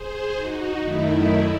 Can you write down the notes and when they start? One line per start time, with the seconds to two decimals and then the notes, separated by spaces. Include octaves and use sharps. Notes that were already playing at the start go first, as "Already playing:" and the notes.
Already playing: G#4 C5
0.34 D#4 F#4
0.80 F#2 D#3 A3 D#4 E4